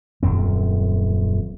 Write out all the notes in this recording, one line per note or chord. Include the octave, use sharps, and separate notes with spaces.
D#1 F#2 C4